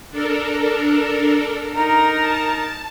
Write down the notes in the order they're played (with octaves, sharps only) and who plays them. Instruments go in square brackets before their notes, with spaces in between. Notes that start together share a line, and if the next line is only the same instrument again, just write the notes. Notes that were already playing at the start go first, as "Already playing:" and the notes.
[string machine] D4 A4 A#4
[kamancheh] D#4 A#4
[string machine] A5